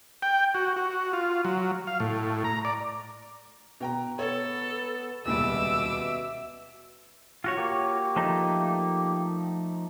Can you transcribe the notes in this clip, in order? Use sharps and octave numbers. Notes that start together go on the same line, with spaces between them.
G5
F#4
F#4
F4
F#3
F5
A2
A#5
D5
B2 G5 A#5
B3 A4 C#5
D#1 C#2 B2 G3 E5 D6 E6
F4 F#4 C#5 F#5
A#3 G4
F3 A3 D#4